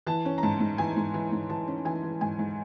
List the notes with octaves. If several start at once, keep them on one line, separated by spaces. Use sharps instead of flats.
E3 A5
C#4
A#5
G#2 A5
G#2
E3 G#5
G#2
E3
G#2
E3 A5
C#4
E3 G#5
E3
G#2 G#5
G#2